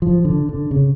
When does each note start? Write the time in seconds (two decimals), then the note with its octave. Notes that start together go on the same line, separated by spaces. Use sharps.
0.02 F3
0.25 D3
0.49 D3
0.71 C#3